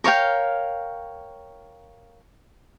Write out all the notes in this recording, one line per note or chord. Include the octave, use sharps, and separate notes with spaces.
A#4 C#5 F5 G5